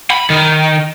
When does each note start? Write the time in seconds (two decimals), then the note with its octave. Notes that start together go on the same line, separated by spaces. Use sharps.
0.10 B5
0.30 D#3